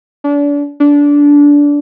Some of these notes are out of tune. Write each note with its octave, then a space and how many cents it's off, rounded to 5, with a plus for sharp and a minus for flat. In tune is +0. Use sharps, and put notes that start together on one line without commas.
D4 -35
D4 -20